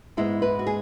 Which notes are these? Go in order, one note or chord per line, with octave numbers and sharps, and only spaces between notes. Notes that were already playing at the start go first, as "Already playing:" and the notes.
G#2 G#3 B3 E4
B4
F#4
G#4